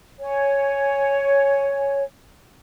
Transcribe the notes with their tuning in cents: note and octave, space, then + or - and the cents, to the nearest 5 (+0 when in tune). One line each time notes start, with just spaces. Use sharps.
C#5 +0 G#5 +0